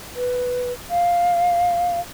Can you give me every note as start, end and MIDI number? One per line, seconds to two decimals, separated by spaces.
0.16 0.72 71
0.90 2.00 77